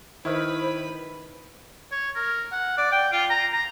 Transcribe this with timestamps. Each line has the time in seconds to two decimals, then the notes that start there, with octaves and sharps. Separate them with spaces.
0.25 D#3 E4 B4 C5 B5
1.92 C#5
2.16 A#4
2.52 F#5
2.78 D5
2.92 G5
3.12 F4
3.30 A#5
3.53 A#5